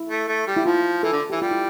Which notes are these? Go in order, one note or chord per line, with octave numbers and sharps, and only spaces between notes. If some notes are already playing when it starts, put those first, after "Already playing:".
Already playing: E4
A3
A3
G3
E4
F3 F4
E3 A4
D3
E3 G4
G3 F4
E4